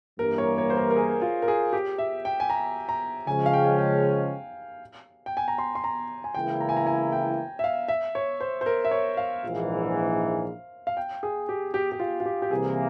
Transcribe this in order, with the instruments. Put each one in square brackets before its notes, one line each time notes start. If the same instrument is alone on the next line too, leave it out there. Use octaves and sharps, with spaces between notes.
[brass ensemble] G2 E3 A#3 [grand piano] A#4
[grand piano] C#5
C#5
C5
A#4
A#4
G#4
F4
A#4
G#4
G4
E5
G5
G#5
A#5
A#5
[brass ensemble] C#3 F3 G#3 C#4 [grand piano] G#5
[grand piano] F5
G5
G5
G5
G#5
A#5
C6
C6
A#5
G#5
[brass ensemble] C#2 C#3 E3 A#3 E4 [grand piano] G5
[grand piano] A#5
G#5
A#5
G#5
G5
E5
F5
E5
C#5
C5
C5
A#4
E5
C#5
F5
[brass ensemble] A#1 G#2 E3
[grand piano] F5
G5
G#4
G4
G4
G4
F4
F4
G4
G4
[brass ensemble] C2 C3 E3 A#3 [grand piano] G#4